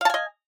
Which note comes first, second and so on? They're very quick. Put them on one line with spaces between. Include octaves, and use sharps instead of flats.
F5 A5 G#5 D#5